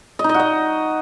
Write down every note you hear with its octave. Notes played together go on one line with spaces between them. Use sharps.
D#5
D#4
D#5
F#4
D#5